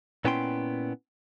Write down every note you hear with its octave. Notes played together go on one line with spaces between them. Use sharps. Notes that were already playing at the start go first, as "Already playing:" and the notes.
A#2 B3 C#4 E4 G5 C6